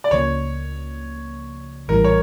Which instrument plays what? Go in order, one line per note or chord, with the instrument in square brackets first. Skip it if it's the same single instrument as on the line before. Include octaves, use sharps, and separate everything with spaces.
[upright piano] D5
[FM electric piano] C#2 C#3 F3 A#3 [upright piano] C#5
[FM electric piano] A#1 A2 E3 G3 [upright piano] A#4
[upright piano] C#5